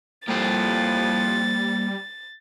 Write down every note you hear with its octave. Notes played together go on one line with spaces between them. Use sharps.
F2 A2 F3 G3 A#3 C5 A6